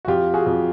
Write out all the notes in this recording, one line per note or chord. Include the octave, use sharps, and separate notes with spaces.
F#4
F2 F4 G4
F#4 G#4
F2